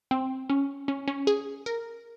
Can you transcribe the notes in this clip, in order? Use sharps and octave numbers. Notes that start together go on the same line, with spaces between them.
C4
C#4
C#4
C#4
G#4
A#4